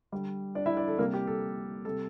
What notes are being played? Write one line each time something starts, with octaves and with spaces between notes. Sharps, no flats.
D3 G3
D4 D5
E4 E5
D4 D5
A4
C3 G3 A#3 A#4
G4
A4
C3 G3 A4